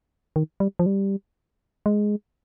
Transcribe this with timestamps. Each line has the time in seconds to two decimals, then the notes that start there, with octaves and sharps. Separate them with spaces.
0.36 D#3
0.60 G3
0.79 F3
0.86 G3
1.86 G#3